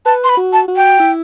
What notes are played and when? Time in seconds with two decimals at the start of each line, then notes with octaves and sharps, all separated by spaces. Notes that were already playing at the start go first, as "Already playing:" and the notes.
0.05 B4 A5
0.24 C6
0.29 B5
0.37 F#4
0.53 A5
0.68 F#4
0.76 G5
1.00 E4